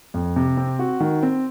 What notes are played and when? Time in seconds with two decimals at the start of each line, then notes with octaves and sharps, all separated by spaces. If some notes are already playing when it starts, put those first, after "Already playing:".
0.14 F2
0.36 C3
0.57 C4
0.79 F#4
1.00 D#3
1.23 C4